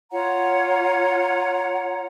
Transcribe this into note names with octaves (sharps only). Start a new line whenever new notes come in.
F4 C#5 F#5 A#5